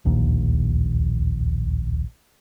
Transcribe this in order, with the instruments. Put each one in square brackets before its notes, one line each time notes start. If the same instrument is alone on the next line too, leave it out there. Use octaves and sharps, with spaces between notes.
[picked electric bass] D1 A#1 D#2